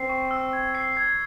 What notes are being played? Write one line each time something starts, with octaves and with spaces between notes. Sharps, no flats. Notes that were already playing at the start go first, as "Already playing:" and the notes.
Already playing: C4 C7
C#6
E6
G#6
C7
G#6